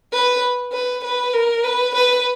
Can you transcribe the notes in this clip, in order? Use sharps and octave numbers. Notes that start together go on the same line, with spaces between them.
B4
B4
B4
A#4
B4
B4